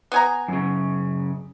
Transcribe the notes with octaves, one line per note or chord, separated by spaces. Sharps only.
B3 G#5 A#5
F#2 C#3